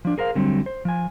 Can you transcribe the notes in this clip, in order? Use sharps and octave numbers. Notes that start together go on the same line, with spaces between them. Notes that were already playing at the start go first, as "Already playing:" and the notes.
F3 D4
G#4 A#4 C5 F5
D3 F#3 G3 A3 C4
C5
F3 G#5